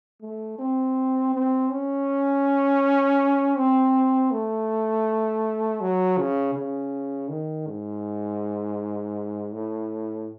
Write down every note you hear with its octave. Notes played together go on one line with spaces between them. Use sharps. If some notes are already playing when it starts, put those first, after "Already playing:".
A3
C4
C4
C#4
C4
A3
F#3
C#3
C#3
D#3
G#2
A2